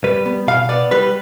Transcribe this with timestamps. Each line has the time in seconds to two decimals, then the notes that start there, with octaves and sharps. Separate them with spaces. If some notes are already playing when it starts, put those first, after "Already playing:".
0.04 G3 B4
0.26 B3
0.48 B2 F5
0.69 B3 D5
0.91 G3 B4